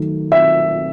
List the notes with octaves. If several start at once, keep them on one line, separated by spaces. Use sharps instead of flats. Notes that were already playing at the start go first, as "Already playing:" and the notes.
Already playing: D#3 F#3 A3
E5